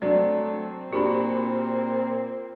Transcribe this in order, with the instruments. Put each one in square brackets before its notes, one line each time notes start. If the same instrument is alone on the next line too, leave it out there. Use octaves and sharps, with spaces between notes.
[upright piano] F#3 D4 [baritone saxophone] A3 [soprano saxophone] C4 [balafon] D5
[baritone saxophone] A#2 [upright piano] D4 B5 [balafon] F#4 G4